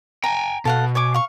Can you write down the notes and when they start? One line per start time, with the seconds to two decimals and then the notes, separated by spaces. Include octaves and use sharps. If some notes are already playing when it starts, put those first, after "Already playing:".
0.24 G5 G#5 A#5
0.65 B2 A4 F5 F#5
0.95 C#5 G#5 D6
1.14 F5 C#6